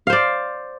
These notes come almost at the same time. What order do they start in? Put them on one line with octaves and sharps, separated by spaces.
F5 C5 D5